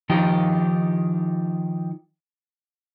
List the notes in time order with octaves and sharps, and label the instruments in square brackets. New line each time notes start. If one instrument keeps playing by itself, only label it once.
[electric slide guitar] D#3 F3 D#4 G4